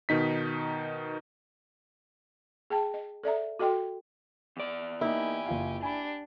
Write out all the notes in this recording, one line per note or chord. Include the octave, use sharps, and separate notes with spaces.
B2 D#3 D#4 B6
G#4 G5 A5
D#5
A4 D5 E5 A#5
F#4 A4 D#5 G5 C6
E2 D5
A#3 D#4 E4 G4 G#5
F#1 F4 F5
D4 G4 G#5 B5